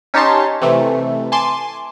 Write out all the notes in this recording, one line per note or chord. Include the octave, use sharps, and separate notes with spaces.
C#4 D#4 G4 C#5 A5 C6
C3 E3 A3
G#5 A5 C6 D6